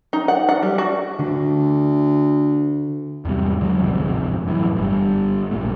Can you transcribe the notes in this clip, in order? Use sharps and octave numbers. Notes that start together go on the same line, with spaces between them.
D#4
F#5
F#5
G3
F#4
D2 D3
E2 G#2 C3 G3
D3 F#3 G#3
D1 G#1 F2 C3
F#2 A2 D3 E3
G1 G3
A#1 A#2 A3